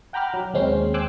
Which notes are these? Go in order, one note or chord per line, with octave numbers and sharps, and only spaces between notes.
F#5 G5 A#5 B5 D6 F6
F#3
D#2 G#3 C4 C#4 C6
G5 G#5 C6 D6 E6 F#6